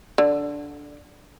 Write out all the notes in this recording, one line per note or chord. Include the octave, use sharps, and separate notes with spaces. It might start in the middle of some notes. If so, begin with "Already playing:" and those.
D3